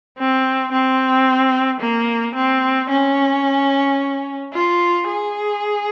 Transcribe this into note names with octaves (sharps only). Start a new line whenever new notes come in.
C4
C4
A#3
C4
C#4
F4
G#4